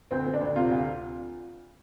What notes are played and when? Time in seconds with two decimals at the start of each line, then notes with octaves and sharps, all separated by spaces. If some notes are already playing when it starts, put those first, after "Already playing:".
0.11 D2 C4
0.26 D2
0.34 D4
0.41 D2
0.56 C3 F4
0.71 D2